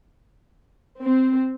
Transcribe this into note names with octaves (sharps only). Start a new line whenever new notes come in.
C4